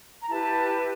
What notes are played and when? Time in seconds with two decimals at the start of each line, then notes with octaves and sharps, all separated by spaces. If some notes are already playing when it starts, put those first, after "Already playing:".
0.22 A#5
0.29 E4 G4 B4 A5